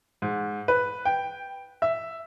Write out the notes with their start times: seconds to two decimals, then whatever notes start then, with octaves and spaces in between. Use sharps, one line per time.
0.22 G#2
0.68 B4
1.05 G5
1.82 E5